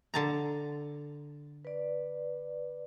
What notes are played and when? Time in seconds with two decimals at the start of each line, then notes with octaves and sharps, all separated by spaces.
0.14 D3 A5 A#5
1.65 B4 D5